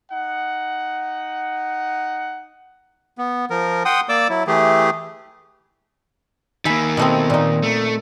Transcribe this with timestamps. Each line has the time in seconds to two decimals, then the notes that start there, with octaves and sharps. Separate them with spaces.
0.11 D#4 F#5
3.18 B3
3.50 F3 A#4
3.85 F#5 G5 C6 D#6
4.09 A#3 D5 D6 E6
4.29 F#3 E4
4.47 E3 A3 G4 G#4
6.65 D#3 A#3 E5 G#5 B5
6.97 B2 A3 C4
7.30 A#2 D#4
7.63 A3